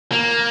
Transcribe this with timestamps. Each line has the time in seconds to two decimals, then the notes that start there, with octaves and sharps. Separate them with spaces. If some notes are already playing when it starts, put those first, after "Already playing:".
0.12 A#3